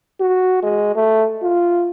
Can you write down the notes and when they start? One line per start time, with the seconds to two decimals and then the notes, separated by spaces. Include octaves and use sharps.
0.20 F#4
0.63 G#3
0.96 A3
1.43 F4